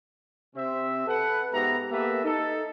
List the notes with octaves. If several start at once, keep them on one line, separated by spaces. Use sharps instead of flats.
C3 C4 E5
A4 B4 F#5
G#2 B3 G4 E5 A#5
A#3 B3 G4 A4 B4 E5
D#4 A4